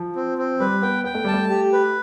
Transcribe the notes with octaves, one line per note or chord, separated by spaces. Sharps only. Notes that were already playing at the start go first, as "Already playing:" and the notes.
Already playing: F3
C4
C4
G3 B4
B3 G5
B3 G5
A3
G3 A5
A3
G4
B4